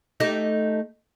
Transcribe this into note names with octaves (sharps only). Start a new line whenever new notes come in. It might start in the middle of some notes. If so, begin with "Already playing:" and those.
A3 D#4 G4